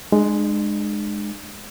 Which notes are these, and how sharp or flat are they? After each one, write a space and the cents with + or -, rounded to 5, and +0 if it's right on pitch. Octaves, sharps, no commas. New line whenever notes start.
G#3 +0 D4 +40